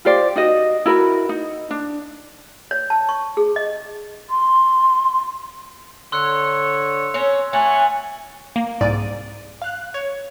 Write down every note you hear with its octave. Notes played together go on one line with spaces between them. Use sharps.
F4 G4 C5 D5
D#4 F#4 D#5
E4 F#4 A#4 B4
D#4
D4
C#5
A5
C#6
G#4
D#5
C6
D3 C#5 C6 E6 F#6
C4 C#4 C#5
A3 C#5 F#5 G#5
A#3
C2 G#2 D5 A6 D#7
F5 F#6
C#5